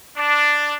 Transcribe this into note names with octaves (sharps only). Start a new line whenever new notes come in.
D4